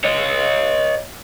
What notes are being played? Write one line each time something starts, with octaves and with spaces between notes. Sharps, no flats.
C#5 D#5